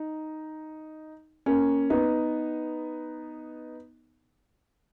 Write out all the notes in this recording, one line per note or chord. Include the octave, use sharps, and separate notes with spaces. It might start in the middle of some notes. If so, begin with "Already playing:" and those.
Already playing: D#4
A#3 C#4
B3 D#4